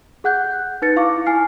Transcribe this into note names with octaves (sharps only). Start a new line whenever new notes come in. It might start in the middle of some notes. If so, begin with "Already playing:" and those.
G#4 F#5 F#6 G6
D#4 B4 A6 C#7
E4 F5 C#6 D6
E4 G#5 F6 C7